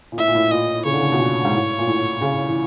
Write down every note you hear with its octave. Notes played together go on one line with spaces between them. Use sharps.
A#2
A2 E5
A#2
A2
A#2 D#5
C#3 C#5
D3
C#3
B2
A#2
G#2
A2
A#2
A2
C#3
E3